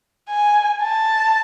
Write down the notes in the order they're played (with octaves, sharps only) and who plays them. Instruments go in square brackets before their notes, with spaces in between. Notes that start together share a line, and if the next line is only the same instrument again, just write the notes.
[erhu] G#5
A5